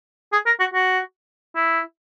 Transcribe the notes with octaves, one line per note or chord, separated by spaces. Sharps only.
G#4
A#4
F#4
F#4
E4